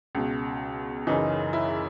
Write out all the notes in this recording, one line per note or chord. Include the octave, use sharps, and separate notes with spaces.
C#2 B2
F#1 F#2 C#3 E3 D#4
E4